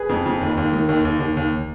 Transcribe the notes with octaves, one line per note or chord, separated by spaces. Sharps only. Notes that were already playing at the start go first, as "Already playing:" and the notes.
Already playing: G#4 B4
F2
F2
D#2
D#2
D#3
D#2
D#2
D#2
D#2